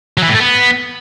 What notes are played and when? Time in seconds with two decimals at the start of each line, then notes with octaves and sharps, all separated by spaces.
0.18 F#3
0.23 E3
0.29 A2
0.34 A3
0.40 B3